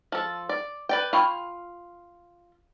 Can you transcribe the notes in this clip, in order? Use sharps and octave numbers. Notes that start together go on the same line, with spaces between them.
F3 A4
D5
B4 D5 G5
F4 G5 B5 C#6